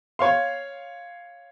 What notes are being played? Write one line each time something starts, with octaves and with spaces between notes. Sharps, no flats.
C#5 F5 C6